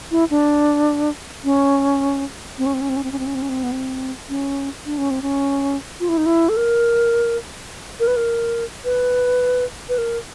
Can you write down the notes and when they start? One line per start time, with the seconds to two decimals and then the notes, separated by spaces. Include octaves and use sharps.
0.11 E4
0.30 D4
1.44 C#4
2.58 C4
2.66 C#4
2.74 C4
2.81 C#4
2.89 C4
2.96 C#4
3.04 C4
3.12 C#4
3.19 C4
3.26 C#4
3.35 C4
3.42 C#4
3.49 C4
3.63 B3
3.72 C4
4.29 C#4
4.86 D4
4.98 C#4
5.10 C4
5.22 C#4
6.00 F4
6.09 E4
6.17 D#4
6.26 E4
6.49 A4
6.57 A#4
8.00 A#4
8.07 B4
8.17 A#4
8.85 B4
9.89 B4
9.98 A#4